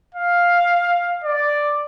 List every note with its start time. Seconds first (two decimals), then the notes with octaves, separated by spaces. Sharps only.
0.14 F5
1.24 D5